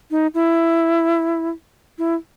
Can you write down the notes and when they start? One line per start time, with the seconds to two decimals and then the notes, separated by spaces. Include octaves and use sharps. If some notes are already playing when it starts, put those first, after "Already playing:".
0.11 D#4
0.34 E4
1.98 E4